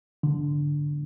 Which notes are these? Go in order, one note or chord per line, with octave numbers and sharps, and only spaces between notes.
D3